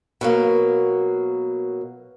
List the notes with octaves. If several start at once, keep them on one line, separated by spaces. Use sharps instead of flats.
B2 F#3 A#3